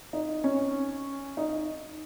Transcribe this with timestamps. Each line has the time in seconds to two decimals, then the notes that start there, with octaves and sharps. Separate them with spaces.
0.13 D#4
0.44 C#4
1.37 D#4